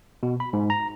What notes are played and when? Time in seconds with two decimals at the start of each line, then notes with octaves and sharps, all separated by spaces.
0.23 B2
0.40 B5
0.53 G#2
0.70 A#5